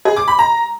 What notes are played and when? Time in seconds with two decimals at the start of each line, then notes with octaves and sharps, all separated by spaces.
0.05 G#4
0.16 D6
0.28 B5
0.39 A#5